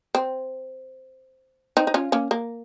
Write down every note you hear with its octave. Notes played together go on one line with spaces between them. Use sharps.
C4
C4 D#4
D#4
C#4 F4
A#3 C#4
A#3